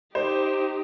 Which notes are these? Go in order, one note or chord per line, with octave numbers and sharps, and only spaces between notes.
D#4 G4 C5